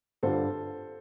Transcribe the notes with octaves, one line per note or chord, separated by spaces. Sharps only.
G2 D3 G3 D4 F4 A4 C5